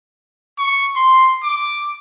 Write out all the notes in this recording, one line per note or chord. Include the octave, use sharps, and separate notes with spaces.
C#6
C6
D6